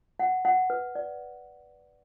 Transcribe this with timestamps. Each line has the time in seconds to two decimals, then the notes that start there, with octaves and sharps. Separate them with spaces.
0.19 F#5
0.45 F#5
0.70 B4
0.95 D5